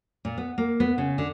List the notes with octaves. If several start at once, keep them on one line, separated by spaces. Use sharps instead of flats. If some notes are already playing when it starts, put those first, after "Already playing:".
A#2
B3
A#3
B3
C#3
D3